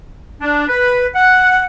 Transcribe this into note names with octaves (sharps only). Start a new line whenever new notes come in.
D4
B4
F#5